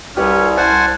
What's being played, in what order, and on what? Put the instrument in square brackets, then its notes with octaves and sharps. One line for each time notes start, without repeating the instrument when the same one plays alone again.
[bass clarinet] C2 [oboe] C#4 [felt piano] G4 B4 D5
[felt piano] E4 [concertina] C5 F#5 G#5 [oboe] A5